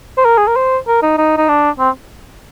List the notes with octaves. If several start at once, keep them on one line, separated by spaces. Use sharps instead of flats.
C5
A#4
G#4
A#4
C5
A#4
D#4
D#4
D#4
D4
C4